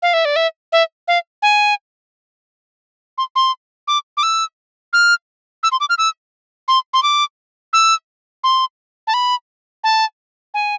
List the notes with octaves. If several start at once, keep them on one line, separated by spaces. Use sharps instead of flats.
F5
E5
D5
E5
E5
F5
G#5
C6
C6
D6
D6
E6
F6
E6
C6
D6
F6
E6
C6
C6
D6
E6
C6
A5
B5
A5
G#5